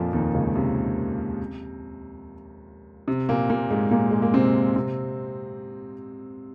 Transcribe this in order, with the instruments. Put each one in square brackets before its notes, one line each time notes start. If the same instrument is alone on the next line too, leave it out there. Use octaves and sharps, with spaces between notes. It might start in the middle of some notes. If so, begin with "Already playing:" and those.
Already playing: [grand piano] F2 A#2 F3 A#3
D#2 D#3
C#2 C#3
C3
C3
A#2 A#3
A#2 A#3
G#2 G#3
A#2 A#3
G#3
A#3
C3 C4
C3 C4